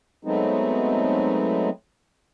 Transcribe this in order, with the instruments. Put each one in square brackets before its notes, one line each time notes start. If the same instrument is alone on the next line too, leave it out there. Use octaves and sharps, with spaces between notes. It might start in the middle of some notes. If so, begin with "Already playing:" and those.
[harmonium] F#3 G#3 A3 B3 C4 D#4